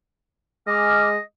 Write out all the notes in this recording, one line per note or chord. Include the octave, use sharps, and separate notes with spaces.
G#3 D#5 G#5 D6 F6